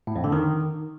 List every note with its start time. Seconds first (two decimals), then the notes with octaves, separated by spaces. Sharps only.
0.07 A2
0.16 F2
0.24 D3
0.32 D#3